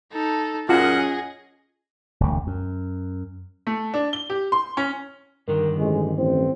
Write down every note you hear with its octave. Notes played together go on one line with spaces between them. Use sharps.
D#4 A4
F#2 A#2 C#4 F4 G#4 D#5 F#5
E1 D2
F#2
A3
D4
G7
G4
C6
C#4
G2 D3 D#3 A#4
A1 G#3
A1 C4